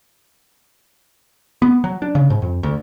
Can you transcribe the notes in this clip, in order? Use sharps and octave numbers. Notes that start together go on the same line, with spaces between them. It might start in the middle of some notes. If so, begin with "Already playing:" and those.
B3
F#3
D4
C#3
G#2
F2
D2